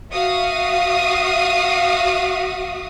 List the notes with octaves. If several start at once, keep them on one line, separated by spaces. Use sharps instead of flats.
F#4 E5 F5 D#6